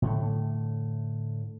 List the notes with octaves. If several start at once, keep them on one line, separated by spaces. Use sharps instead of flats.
A2 D3 A3